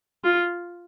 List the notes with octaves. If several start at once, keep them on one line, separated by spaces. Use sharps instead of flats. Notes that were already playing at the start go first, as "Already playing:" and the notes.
F4